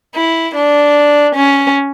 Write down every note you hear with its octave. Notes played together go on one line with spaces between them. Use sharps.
E4
D4
C#4